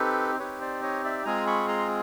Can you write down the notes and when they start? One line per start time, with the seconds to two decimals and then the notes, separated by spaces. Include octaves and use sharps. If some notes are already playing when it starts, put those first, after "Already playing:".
Already playing: C4 D#4 G4 A4 B4
0.39 C4 D#4 G4 B4 C#5
0.61 C5 D5
0.83 C#5 D#5
1.04 D5 E5
1.25 G#3 C4 F4 G#4 G#5 A#5
1.47 B5 C#6
1.68 A#5 C6